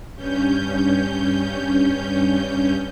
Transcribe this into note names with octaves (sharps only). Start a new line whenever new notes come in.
G2 C#4 G6